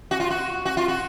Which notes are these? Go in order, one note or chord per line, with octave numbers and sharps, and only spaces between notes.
F#4
F4
F#4
F#4
F4
F#4